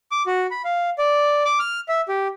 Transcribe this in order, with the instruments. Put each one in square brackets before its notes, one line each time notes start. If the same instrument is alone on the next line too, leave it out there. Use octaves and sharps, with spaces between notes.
[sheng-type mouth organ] D6
F#4
B5
F5
D5
D6
F6
E5
G4